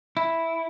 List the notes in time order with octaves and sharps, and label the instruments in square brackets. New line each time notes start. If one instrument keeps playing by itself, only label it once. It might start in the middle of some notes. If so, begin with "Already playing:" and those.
[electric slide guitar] E4